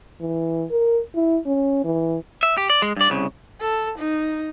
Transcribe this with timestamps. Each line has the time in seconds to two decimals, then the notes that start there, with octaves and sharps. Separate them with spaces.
0.21 E3
0.71 A#4
1.15 E4
1.46 C#4
1.84 E3
2.43 E5
2.58 G4
2.70 D5
2.82 G#3
2.96 G2 D5
3.10 C2 C#3
3.61 A4
3.98 D#4